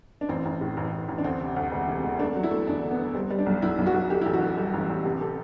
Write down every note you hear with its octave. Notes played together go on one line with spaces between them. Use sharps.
D4
A1 C4
A1
A2
A1
A1
A1
D4
D2 C4
C3
D2
E1
C3
E1
A3 D4
F#3
E4
A3
E2 D4
D3
B3
D3
G3 C4
G3
D4
B1
B1 E4
B1
F#4
B1
D3 G4
A1 E4
F#4
D3
G3
A1
A1
C3 G4
C3 A4